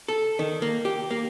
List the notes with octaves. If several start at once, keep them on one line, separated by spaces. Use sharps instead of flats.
A4
D#3
A#3
G4
A#3